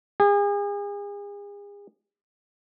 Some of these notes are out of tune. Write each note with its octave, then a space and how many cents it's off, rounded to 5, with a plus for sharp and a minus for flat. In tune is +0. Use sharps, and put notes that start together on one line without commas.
G#4 -40